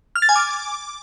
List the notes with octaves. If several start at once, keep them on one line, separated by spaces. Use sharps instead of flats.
F6
A6
G#5
D6